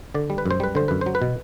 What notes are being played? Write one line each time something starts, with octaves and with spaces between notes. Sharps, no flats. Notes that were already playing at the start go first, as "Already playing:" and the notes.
D3 D5
G3
B4
F#2 C5
G3 B4
D3 C5
F#2 B4
F#3 C5
B4
B2